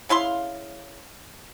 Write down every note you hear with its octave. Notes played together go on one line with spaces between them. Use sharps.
C#3 E4 F5 C6